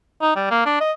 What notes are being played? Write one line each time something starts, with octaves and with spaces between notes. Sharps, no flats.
D#4
G3
A#3
D4
D#5